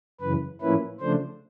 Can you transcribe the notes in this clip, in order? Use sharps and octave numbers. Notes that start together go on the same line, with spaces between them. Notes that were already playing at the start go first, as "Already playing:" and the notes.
F#2 C#3 E3 B4
A2 F3 A#3 C#4 E4 B4
C#3 F3 A3 D4 C5